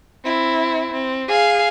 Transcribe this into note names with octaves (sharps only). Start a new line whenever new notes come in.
C4 E4
C4
G#4 F5